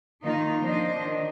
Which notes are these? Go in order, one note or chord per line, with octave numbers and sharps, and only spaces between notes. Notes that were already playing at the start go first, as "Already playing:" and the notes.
D#3 A#3 D#4 F4
F3 D4 C5 D#5
D#3 D4